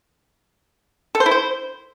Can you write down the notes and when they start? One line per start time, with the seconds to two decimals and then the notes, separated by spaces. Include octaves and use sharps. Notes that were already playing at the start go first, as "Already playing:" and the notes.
1.15 A4
1.20 C5
1.26 E4
1.31 C5